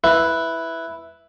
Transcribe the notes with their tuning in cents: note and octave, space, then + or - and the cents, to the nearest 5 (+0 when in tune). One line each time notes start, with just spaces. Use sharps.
E4 +0 B4 +0